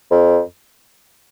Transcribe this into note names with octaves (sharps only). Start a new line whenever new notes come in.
F2